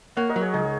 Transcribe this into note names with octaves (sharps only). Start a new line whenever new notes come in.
A#3 C#5 F#5
A#4 D#5
F#3
G#4 C#5
C#2 D#4 G#4